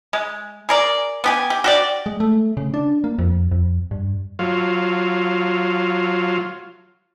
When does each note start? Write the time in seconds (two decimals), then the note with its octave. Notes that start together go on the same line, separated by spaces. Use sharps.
0.13 G#3
0.69 G#4 A#4 D5
1.24 B3 G4 G#5
1.50 G4
1.64 F#4 G4 D5
2.06 G#3
2.20 A3
2.57 C#3
2.74 D4
3.04 A#3
3.19 F2
3.52 F2
3.91 G2
4.39 F#3 F4